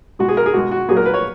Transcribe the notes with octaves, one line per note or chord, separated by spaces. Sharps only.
B2 G#3 F#4
G#4
A#4
G#4
B2 G#3 F#4
F#4
A#2 F#3 G#4
A#4
B4
C#5